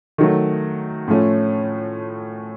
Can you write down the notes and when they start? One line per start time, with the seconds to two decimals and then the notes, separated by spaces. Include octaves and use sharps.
0.18 D#3 F#3 A3
1.08 A2 F3 A3 C#4